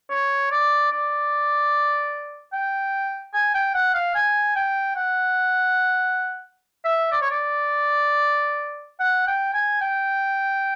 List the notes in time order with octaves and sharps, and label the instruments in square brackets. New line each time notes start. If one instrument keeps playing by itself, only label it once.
[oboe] C#5
D5
D5
G5
G#5
G5
F#5
F5
G#5
G5
F#5
E5
D5
C#5
D5
F#5
G5
G#5
G5